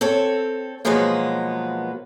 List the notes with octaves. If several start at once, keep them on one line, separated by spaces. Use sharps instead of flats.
C4 A4 C#5
B2 F3 F#3 G#3 A#3 B3